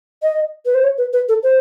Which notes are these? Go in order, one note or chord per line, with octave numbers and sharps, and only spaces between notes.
D#5
B4
C5
C#5
B4
B4
A4
C5